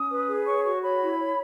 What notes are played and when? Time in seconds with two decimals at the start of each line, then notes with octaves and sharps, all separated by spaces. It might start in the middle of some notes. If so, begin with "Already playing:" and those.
Already playing: C#4 D#6
0.10 B4
0.27 G#4
0.46 C#5 C#6
0.65 F#4 C#6
0.82 C#5 B5
1.01 E4
1.20 C#5